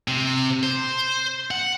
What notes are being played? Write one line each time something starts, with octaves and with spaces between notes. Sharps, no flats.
C3
C5
F#5